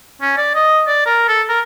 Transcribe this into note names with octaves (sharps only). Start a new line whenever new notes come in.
C#4
D5
D#5
D5
A#4
A4
A#4